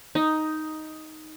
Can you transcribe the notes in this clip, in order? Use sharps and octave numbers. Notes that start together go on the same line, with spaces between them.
D#4